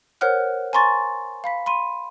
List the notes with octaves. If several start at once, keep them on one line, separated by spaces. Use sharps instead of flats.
A#4 C5 C#5 F#5 F6 F#6
G#5 A#5 C6 C#6 A6
F5 B5 B6
B5 C6 D#7